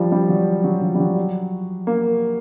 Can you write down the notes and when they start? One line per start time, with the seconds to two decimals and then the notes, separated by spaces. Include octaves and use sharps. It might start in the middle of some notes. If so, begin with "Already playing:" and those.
Already playing: F3 G3
0.12 G3
0.29 F#3
0.64 F#3
0.82 F3
0.95 G3
1.00 F#3
1.87 A#3